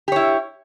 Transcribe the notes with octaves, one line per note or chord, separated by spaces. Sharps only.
E4 G4 C#5